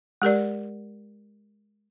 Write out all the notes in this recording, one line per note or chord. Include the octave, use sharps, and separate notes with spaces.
G#3 G4 A#4 D5